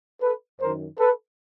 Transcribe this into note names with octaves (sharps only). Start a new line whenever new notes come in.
A4 B4
F#2 D#3 A#4 C5
A4 B4